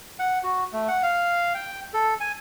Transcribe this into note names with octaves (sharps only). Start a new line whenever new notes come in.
F#5
F#4
A3
F#5
F5
G5
A4
G#5